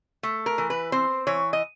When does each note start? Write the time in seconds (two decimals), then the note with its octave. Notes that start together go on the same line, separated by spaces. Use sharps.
0.23 A3
0.46 A#4
0.58 E3
0.70 B4
0.92 C4 C5
1.27 E3 C#5
1.53 D#5